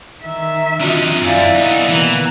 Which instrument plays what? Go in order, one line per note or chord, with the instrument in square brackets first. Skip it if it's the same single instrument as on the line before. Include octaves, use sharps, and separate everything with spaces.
[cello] D#3 E5
[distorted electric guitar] D3 D#4 [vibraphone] C4 F4 F#4
[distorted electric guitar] F#2 [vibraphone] E4 F5 G#5 [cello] D5 E5
[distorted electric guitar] B3 D#4
[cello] B2 A#3 [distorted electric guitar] E3